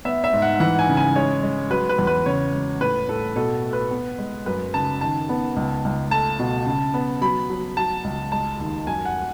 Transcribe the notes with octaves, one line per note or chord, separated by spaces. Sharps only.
B3 E5
E5
G#2
F#5
E3 F#5
G#5
C#3
G#5
G#3 C#5
G#3
F#3 B4
B4
E2
B4
C#3 C#5
G#3
A2 B4
A2 A4
B2 A4
A3
B4
B3
G#3
F#2 B4
C#3 A5
D#3 A5
B3
C#2
C#2
A3 A5
B2
C#3
B3
F#3 B5
F#3
F#3 A5
C#2
G#3 A5
D#2
F#2 G#5
F#5